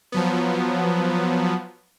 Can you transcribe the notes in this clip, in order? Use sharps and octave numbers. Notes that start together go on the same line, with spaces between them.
F3 F#3 B3